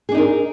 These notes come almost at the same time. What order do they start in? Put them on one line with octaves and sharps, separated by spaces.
G#4 D4 D#4 A#4